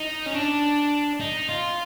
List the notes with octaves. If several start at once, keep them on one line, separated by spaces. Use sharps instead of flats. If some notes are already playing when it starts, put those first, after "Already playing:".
Already playing: D#4
C#4
D4
D#4
F4